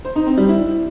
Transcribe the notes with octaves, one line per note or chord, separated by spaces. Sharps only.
C5
D#4
C4
G3
E4